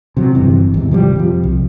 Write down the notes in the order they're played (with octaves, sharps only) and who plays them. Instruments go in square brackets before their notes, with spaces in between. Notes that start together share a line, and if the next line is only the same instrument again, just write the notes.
[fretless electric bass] C3 F#3
G1 G2 C3 E3
G#1 E2
C3 F3 G3
F2 F3
C2